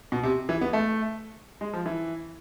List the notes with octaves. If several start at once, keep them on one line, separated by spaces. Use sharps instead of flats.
B2
C3
E3
B3
A3
G#3
F3
E3